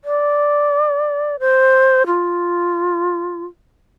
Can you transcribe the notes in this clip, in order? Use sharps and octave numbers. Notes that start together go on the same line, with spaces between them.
D5
C5
F4